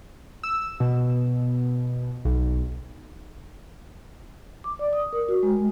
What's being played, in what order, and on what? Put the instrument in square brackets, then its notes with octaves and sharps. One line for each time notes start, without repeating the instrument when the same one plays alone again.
[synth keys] E6
B2
B1
[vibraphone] D6
D5
D#6
A#4
F#4
G#3